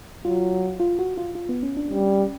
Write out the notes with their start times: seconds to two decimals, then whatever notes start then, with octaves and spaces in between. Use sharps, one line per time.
0.25 F#3 F4
0.80 F4
0.99 F#4
1.17 F4
1.35 F4
1.49 B3
1.63 C#4
1.77 D4
1.91 G3 C#4